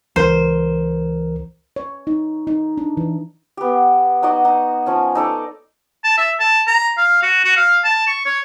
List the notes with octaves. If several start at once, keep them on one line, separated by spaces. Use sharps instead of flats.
C#2 E3 A#4 C5
C#5
D#4
D#4
D4
E3
B3 G4
D#4 F#4 D5 D#5
D#4
F3 C#4 G#5
D#4 A4 D5
A5
E5
A5
A#5
F5
F#4
F#4
F5
A5
C#6
C#5